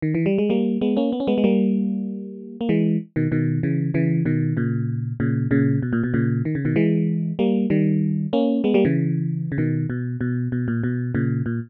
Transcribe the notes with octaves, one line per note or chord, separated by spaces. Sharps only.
D#3
E3
G3
G#3
G3 A#3
G#3 B3
A#3 C#4
B3
C#4
G#3 B3
G#3
G3 A#3
A#3
E3 G#3
B2 D#3
B2 D#3
C#3 E3
C#3 E3
B2 D#3
A#2 C#3
A#2 C#3
A#2 C#3
B2
A#2
B2
A#2 C#3
D#3
C#3
B2 D#3
E3 G#3
G3 A#3
D#3 G3
A#3 C#4
G#3 B3
G3 A#3
C#3 E3
C#3
B2 D#3
B2
B2
B2
A#2
B2
A#2 C#3
A#2